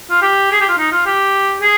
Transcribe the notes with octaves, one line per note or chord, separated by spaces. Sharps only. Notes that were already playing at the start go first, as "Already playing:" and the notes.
F4
G4
G#4
G4
F4
D#4
F4
G4
G#4